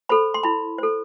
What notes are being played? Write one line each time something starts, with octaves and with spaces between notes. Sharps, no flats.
A4 C5 B5
C6
E4 B5
A4 C5